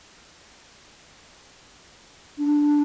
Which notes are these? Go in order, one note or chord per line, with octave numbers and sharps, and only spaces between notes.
D4